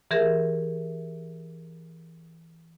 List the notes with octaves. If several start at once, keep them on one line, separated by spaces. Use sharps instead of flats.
E3 G4 G#4 A#4 E5